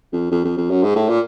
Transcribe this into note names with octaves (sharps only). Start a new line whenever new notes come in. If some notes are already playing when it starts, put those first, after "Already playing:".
F2
F2
F2
F2
F#2
G#2
A2
A#2